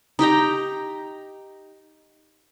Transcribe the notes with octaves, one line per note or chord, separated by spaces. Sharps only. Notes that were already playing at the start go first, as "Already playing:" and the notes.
D#4 G4 G5 A#5